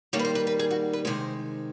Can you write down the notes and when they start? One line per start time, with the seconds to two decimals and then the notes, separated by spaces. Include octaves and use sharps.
0.13 D#3 G3 A#3 C#5
0.19 B4
0.25 C5
0.35 B4
0.47 B4
0.59 G#4
0.71 F#4
0.93 B4
1.05 C3 D#3 G#3 C5